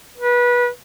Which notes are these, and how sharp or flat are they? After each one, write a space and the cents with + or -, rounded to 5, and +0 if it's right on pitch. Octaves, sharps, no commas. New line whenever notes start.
B4 -25